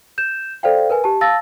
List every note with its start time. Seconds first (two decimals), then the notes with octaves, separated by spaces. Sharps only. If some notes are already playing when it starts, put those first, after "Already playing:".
0.18 G6 E7
0.63 A4 C5 D5 F5 G5
0.90 A#4 B4 G#5
1.04 G4 A5
1.21 F5 A5 E6 A6 A#6